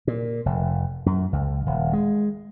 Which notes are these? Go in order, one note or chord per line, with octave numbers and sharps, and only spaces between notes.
A#2
F1
F#2
C#2
D#1
G#3